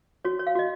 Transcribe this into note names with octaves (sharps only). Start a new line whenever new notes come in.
F#4 C#5
C#5
F5
F#4 D#5